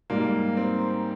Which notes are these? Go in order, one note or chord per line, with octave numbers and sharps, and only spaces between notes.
G#2 G3 A#3
C4